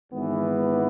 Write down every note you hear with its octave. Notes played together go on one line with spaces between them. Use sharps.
G#1 G#2 E3 B3